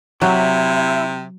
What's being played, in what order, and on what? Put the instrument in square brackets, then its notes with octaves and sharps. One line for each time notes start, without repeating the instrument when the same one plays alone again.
[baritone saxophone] C3 [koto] F#3 [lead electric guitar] E4